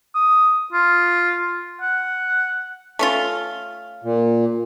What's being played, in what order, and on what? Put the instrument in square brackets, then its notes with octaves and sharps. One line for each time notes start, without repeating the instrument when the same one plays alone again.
[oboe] D#6
F4
F#5
[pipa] A3 C#4 F4
[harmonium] A#2